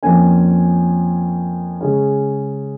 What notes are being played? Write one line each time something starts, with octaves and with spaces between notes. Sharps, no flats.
F2 F3 A#3 C#4 G#5
C#3 G#3 C#4